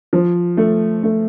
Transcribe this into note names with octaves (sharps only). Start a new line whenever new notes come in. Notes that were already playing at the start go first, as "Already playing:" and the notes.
F3
A3
A3